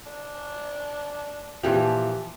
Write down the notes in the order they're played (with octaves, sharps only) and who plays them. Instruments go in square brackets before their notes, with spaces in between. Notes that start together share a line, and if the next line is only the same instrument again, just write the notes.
[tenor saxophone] D4
[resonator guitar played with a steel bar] A#2 E3 F3 [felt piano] G4